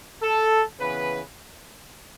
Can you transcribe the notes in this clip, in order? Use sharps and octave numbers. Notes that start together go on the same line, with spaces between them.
A4
C#3 E3 B3 B4